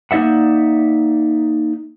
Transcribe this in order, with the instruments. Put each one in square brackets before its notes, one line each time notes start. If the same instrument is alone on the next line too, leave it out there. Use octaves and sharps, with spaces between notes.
[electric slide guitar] A#3 D#4 D5 E5 F#5